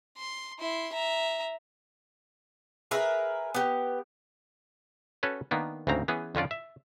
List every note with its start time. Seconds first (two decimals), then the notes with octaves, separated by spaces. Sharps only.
0.17 C6
0.59 E4 C6
0.93 E5 A#5
2.91 G#4 A#4 B4 E5
3.55 B3 G4
5.23 C#4 F#4 A4 B4 C#5
5.51 D#3 A#3 B3 D4
5.87 D2 G#2 C#3 C4 A#5
6.08 E3 B3 C#4 G#4
6.35 F2 D3 C#4 F4 D5
6.51 E5